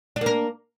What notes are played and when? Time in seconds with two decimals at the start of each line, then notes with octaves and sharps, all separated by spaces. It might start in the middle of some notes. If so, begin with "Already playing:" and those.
0.16 D4
0.21 A#3
0.26 A#4